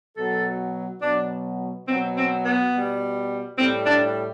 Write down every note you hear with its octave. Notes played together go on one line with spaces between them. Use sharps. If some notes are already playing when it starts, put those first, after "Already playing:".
B2 F#3 A4
B2 F#3 D4
B2 F#3 C4
C4
B3
B2 G3
A2 G3 C4
D4